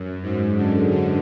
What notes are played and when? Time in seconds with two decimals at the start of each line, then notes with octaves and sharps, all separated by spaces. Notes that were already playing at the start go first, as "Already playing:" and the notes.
Already playing: F#2
0.22 G#2
0.56 D3
0.91 D3